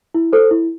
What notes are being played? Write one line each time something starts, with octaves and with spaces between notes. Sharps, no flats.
E4
A4 C5
E4